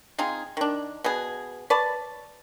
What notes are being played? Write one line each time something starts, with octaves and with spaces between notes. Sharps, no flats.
C4 D#4 F4 G#4
D#3 D4
B2 B3 G#4
B4 C#5 D5 A5